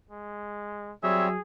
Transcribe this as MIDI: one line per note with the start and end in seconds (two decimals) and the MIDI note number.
0.11 0.93 56
1.03 1.35 54
1.03 1.29 55
1.03 1.29 60
1.03 1.41 68
1.03 1.29 73
1.03 1.28 76